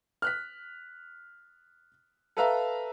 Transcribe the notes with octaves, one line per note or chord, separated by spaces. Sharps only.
F6 F#6 B6
A4 B4 E5 F5 A#5